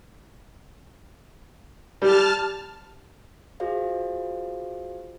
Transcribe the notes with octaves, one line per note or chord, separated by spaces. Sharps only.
G3 A5 F6
F4 F#4 G#4 C5 D#5 F5